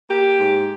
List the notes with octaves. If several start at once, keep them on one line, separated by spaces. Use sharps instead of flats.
A#3 G4
G#2